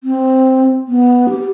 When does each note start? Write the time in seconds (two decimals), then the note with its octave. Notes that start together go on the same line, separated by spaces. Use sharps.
0.04 C4
0.88 B3
1.29 G4